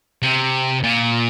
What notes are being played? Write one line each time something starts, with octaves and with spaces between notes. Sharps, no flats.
C3
A#2